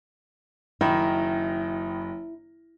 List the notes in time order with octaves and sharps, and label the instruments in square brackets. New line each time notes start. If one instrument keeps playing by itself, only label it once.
[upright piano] F#1 B5 [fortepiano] D#3 [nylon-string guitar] E4